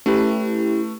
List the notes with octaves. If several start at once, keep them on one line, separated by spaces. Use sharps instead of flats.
A3 C#4 E4 G4 B4